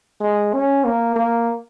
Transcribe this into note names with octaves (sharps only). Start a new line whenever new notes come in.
G#3
C#4
A#3
A#3